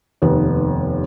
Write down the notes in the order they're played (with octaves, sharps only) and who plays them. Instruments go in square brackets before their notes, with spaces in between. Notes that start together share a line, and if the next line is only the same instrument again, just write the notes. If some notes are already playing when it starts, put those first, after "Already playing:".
[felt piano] F1 D#2 B3